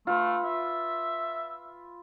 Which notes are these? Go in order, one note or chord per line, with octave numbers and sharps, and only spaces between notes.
A3 F4 B4
E5